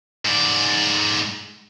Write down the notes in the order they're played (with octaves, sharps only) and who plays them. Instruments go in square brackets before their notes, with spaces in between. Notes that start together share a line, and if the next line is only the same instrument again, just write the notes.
[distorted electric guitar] G#2 D5